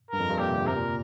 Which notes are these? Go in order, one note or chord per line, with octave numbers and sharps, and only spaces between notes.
G2 A#4
F2
G2
A#2 G4
C3
D3
C3 A#4
A#2